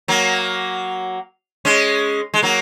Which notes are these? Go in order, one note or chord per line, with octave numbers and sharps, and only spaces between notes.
F#3 A#3
G#3 C#4
G#3
F#3 A#3